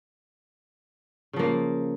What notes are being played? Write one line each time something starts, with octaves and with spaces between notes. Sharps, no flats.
C#3 F3 A#3